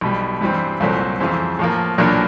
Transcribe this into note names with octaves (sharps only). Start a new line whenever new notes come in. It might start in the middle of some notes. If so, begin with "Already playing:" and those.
B1 B2 G3
G2 E3 G3 C4
C2 A#2 F#3 A3 C4
F2 C#3 E3 G#3 C4
A2 F3 A#3
B1 A#2 F#3 A#3 D4